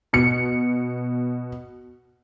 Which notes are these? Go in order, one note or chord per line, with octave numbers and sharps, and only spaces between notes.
B2 C#7